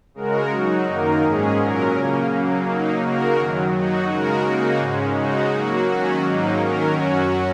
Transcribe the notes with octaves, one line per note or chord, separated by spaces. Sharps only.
C#3 G#3 F#4 A#4
F#3 D#4 F#4
F#2 D#3 A#3 D#4 A#4
G#2 G#3 C#4 G#4
A#2 F#3 C#4 A#4
C#3 A#3 C#4
C#3 F#3 A#3
F#3 A#3 D#4
C#3 A#3 F#4 A#4
F#2 D#3 F#3
F#3 D#4 F#4
C#3 G#3 F#4 A#4
C#3 A#3 D#4 F#4
G#2 G#3 C#4
C#3 G#3 D#4 F#4
F#3 A#3 F#4
D#3 F#3 C#4 F#4
G#2 F#3 A#3 D#4
D#3 F#3 C#4 A#4
F#2 F#3 C#4 F#4